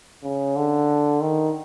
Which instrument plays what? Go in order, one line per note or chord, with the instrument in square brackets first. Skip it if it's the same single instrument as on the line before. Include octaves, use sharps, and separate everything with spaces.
[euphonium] C#3
D3
D#3